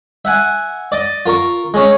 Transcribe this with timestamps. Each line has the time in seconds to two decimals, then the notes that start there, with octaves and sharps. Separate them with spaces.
0.25 E5 F#5 G#5
0.92 D5 D#5
1.26 F4 A#4 A#5 C#6
1.74 G#3 C#4